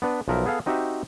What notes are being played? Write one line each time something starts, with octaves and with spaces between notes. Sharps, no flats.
B3 D4 B4
B1 F3 A#4 B4 E5
B3 G#4 A4 F5
C4 D#4 F#4 G4 E5